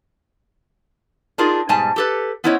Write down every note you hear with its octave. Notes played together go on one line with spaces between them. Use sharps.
D4 D#4 F4 G#4 A#4
G#2 B2 G3 G#5 A5
G4 A4 B4
B3 C#4 E4 C5 C#5 D#5